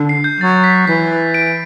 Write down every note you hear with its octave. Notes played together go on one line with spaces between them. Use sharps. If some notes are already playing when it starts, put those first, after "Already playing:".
Already playing: D3
C7
G6
F#3 A6
B6
E3 B6
D7